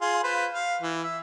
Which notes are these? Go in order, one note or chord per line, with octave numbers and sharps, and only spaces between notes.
F4 G#4 C6
F4 B4 C5
F5
E3
E5